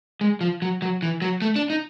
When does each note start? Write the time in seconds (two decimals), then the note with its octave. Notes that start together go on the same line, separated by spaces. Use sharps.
0.21 G#3
0.41 F3
0.62 F#3
0.82 F#3
1.02 E3
1.22 F#3
1.42 A3
1.56 D4
1.70 D#4